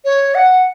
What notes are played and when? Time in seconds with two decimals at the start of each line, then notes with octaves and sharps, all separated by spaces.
0.05 C#5
0.35 F#5